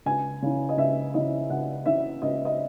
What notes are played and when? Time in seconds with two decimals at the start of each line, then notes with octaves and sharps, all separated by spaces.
0.06 C#2 G#5
0.42 C#3 E3
0.69 D#5
0.77 C#2 E5
1.14 C#3 E3 D#5
1.50 C#2 F#5
1.86 C#3 E3 E5
2.22 C#2 D#5
2.45 D#5